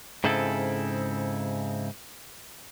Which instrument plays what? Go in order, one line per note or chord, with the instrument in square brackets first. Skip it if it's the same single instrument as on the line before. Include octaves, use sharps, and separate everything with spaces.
[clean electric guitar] G#2 C#3 C4 E4 A4